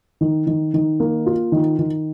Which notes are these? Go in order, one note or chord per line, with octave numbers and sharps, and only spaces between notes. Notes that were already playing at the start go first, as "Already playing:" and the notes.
D#3
D#3
D#3
A#3
F4
D#3
D#3